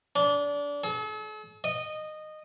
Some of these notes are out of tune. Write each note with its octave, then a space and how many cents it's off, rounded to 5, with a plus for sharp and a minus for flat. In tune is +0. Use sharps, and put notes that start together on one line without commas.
D4 -25
A4 -45
D#5 -15